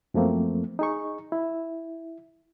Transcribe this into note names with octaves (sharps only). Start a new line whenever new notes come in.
F#2 F3 A3 A#3 C4
D#4 G#4 C#6
E4